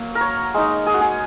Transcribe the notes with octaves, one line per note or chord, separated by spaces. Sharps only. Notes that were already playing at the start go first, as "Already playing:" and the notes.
Already playing: F#3 A#3
A#4
C#5
G#3 D#4
G#4
F#4
G#4